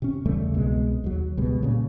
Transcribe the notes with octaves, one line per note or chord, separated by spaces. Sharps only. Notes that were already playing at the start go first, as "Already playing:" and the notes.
C3 C#4
E2 C#3 G3 A3
C2 B2 D3 G#3
D#2 F#3
C#2 B2 G3 G#3
A#2 C#3